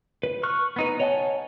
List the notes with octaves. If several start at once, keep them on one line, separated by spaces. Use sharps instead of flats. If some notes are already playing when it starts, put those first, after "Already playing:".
B4
C#6 F6 F#6
B3 D#4 B4
C#5 D#5 F#5 G#5 A5